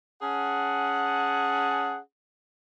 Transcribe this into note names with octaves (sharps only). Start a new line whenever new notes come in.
C#4 G#4 F#5 A5